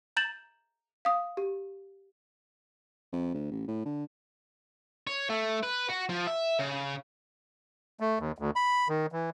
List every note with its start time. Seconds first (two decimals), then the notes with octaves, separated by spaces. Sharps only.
0.17 A#5 G6 A6 E7 F#7
1.05 F5 D#6
1.37 G4
3.12 F2
3.34 D2
3.51 A1
3.68 A2
3.85 D3
5.07 C#5
5.29 A3
5.63 B4
5.90 F#4
6.10 F3
6.27 E5
6.59 C#3
8.00 A3
8.19 D#2
8.38 D2
8.56 B5
8.89 D#3
9.12 E3